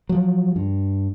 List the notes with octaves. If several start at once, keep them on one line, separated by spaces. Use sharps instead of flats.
F3 F#3
G2